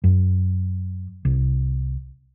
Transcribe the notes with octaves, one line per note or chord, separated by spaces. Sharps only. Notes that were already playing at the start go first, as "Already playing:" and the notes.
F#2
C2